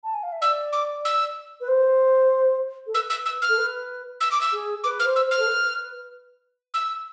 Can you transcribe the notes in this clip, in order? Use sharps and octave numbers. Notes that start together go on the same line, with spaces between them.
A5
G#5
F5
E5
D5 E6
D6
E6
B4
C5
A4
B4 E6
E6
E6
F6
A4
B4
E6
D6
E6
G#4
B4 D6
F6
C5
E6
C5
F6
A4
B4
E6